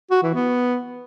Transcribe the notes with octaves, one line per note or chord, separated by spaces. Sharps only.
F#4
E3
B3